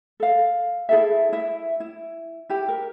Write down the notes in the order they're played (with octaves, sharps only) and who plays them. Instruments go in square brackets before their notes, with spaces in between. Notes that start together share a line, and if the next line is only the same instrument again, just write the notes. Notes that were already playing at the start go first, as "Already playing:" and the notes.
[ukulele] A4 F5
E4 G#4 A4 E5
E4 E5
E4
E4 G4
A#4